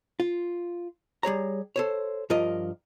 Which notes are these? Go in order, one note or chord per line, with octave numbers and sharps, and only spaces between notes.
F4
G3 G#4 C#5 A#5
A4 C5 C#5
G2 F3 F4 A#4 D#5